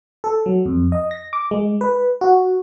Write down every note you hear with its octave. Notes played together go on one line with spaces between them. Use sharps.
A4
F#3
F2
D#5
A#6
D6
G#3
B4
F#4